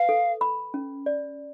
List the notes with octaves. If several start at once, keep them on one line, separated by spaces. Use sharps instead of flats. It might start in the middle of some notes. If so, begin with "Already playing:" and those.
Already playing: B4 F5
A4
B5
C#4
D5